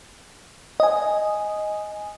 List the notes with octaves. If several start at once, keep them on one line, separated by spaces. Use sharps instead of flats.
D#5 G#5